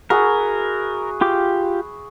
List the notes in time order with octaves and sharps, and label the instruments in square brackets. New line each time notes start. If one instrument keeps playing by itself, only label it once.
[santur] E4 F#4 G#4 [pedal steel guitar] A#4
[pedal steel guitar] F4 G4 D6